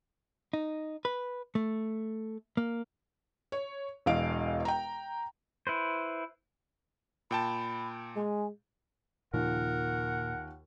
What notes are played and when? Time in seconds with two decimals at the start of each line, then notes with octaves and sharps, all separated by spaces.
0.53 D#4
1.05 B4
1.55 A3
2.57 A#3
3.52 C#5
4.06 E1 E2 D#5 F5 D7
4.65 G5 A#5
5.67 E4 B4 C5
7.31 A#2 G5 A5 B5
8.16 G#3 G#5
9.34 D#2 A#2 C#3 F3 F4 A#4 F#5